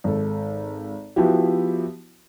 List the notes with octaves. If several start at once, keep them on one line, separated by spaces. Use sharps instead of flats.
G#1 A4
F3 B3 E4 F#4 G4